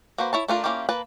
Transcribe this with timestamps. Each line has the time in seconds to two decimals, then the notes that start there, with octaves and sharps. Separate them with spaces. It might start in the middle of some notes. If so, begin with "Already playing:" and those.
0.18 A#3 F#4 B4 C5
0.33 E4 C#5 A5
0.48 A3 D4 F4 A#4
0.64 A#3 C#4 E4 F4 G4
0.89 A#3 B4 A5